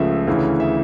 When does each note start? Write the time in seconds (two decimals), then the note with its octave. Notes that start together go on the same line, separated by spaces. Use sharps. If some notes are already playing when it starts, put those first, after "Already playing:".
Already playing: C#2 C#3 F3 A3 E5
0.27 D2 C#3 E3
0.60 E5